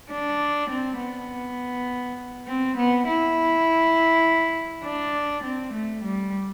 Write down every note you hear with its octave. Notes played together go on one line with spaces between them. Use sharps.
D4
C4
B3
C4
B3
E4
D4
C4
A3
G3